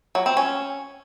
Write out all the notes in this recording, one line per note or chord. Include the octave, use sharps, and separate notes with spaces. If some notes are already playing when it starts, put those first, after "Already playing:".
F#3
C4
C#4